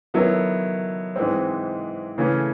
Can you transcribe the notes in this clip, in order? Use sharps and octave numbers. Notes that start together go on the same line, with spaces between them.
D#3 F#3 B3 E4 A4
G#2 E3 G#3 C4
C#3 E3 A3 C#4